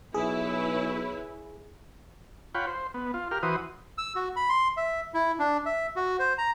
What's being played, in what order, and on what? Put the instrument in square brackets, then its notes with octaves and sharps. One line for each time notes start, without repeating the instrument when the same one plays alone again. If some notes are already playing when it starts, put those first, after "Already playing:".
[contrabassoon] B1 [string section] E4 B4 C#5 [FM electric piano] G#4
[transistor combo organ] F4 C#5 F#5 G5 B5
C5
B3
F4
G4 A#4 F6
E3 F#4 B4 C5 D#6
[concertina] E6
F#4
B5
C6
E5
E4
D4
E5
F#4
C5
A#5